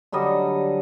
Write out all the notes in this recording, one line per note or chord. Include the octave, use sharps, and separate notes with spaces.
D3 F#3 G3 D#5